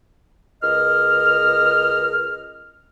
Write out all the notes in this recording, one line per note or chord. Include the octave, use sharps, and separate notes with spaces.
C#2 A#4 D#5 F6